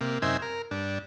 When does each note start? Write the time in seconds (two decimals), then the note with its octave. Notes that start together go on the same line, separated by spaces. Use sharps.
0.01 C3 A#3
0.22 F#2 C3 D#4 C5 E5 G#5
0.42 A#4
0.71 G2 D4